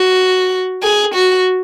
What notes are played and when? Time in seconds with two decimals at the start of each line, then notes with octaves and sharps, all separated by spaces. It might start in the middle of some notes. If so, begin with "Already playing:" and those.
Already playing: F#4
0.83 G#4
1.14 F#4